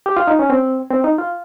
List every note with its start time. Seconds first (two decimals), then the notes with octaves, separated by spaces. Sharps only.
0.06 G4
0.17 F4
0.27 D#4
0.39 C#4
0.50 C4
0.91 C4
1.04 D#4
1.18 F4